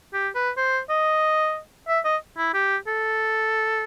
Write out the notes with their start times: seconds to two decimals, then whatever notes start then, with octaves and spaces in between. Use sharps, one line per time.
0.13 G4
0.35 B4
0.57 C5
0.89 D#5
1.88 E5
2.05 D#5
2.37 E4
2.54 G4
2.87 A4